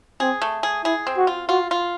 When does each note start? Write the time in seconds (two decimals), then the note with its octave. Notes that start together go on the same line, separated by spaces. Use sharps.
0.20 C4 G#4
0.42 A3
0.63 G#4
0.85 E4 G#4
1.07 C4
1.17 F#4
1.27 F4
1.49 F4 F#4
1.71 F4